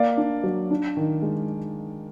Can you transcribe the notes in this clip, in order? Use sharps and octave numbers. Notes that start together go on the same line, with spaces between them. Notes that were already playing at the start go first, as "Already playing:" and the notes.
Already playing: A#3 D5 F5
D4
F#3
D4
D#3
G#3